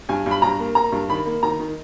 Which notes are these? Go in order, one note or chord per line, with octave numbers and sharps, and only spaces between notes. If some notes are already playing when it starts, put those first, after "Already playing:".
G2 G#5
G2 B5
G2 A#5
A#3
A#3 A#5
G2
D#3 B5
A#3
D#3 A#5
D#3